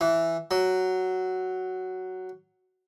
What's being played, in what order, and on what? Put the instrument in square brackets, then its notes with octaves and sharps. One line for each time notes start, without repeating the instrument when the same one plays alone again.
[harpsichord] E3
F#3